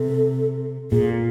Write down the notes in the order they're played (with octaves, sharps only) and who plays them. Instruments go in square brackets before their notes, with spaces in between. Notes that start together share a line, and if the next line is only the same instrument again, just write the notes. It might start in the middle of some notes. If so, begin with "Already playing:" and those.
Already playing: [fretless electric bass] C3 [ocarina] A4
[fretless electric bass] A#2 [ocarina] G#4